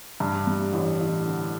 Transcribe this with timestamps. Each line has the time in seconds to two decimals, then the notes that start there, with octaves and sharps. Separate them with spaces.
0.20 G2
0.47 G3
0.73 A1
1.00 A1
1.27 D3